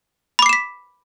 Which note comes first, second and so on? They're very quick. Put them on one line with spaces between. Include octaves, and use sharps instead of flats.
B5 D6 C7 E7 B6